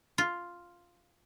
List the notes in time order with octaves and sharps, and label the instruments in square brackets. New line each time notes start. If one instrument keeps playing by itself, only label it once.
[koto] F4